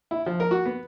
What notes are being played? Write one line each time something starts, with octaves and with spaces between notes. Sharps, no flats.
E4
F3
A#4
F#4
B3